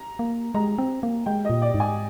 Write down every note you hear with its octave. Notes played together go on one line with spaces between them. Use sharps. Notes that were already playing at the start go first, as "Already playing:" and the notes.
Already playing: A#5
A#3
G#3 A#5
C4
A#3
G#3 G5
A#2 D#5
D5
G#2
G#5